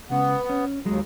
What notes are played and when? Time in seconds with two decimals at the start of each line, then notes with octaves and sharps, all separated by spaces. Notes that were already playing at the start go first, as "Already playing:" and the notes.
0.10 C#2 C#3 B3
0.49 C#4
0.85 D#2 F#3 G#3